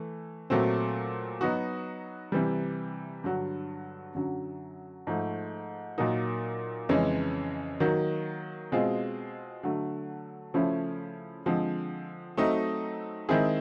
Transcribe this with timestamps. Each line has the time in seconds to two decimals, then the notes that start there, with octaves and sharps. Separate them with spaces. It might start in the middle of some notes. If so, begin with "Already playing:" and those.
Already playing: E3 A3
0.50 A#2 F#3 A3 C4
1.41 F#3 B3 D#4 F#4
2.32 C3 E3 G3
3.24 G2 D3 F#3
4.15 F#2 D3 F#3
5.07 G#2 F3 A3
5.98 A#2 F#3 A#3 D#4
6.89 F2 C#3 E3 G#3 C#4
7.80 D#3 F#3 A#3
8.72 B2 G#3 C4 F4 G#4
9.63 D3 F#3 A3
10.54 C#3 F3 A3 C#4 E4
11.45 D3 F3 G#3 C4
12.37 F#3 A3 C4 D#4
13.29 D#3 G#3 C4 E4 G#4